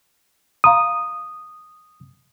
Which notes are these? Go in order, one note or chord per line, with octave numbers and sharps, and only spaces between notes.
F5 A#5 C6 D#6